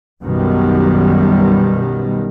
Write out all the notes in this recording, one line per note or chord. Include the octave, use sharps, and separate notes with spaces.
B1 F#2 B2 D#3 G3